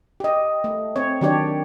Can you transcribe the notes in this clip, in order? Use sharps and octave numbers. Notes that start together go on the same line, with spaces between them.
G4 D#5
A3
C4 C#5
D#3 F#3 D4 G4 C#5 D5